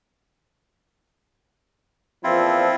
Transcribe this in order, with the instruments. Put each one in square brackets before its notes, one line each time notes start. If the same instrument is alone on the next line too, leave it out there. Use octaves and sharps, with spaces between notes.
[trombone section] E2 A#2 F3 [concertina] C4 E4 F4